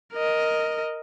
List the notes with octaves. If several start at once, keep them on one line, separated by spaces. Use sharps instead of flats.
A#4 D#5